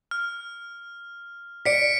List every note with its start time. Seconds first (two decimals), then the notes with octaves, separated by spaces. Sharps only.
0.11 F6
1.65 D5 B6 C#7 D7